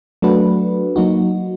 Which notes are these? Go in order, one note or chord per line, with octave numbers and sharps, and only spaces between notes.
F#3 A3 D4 F#4 B4
F#3 A#3 D#4 F#4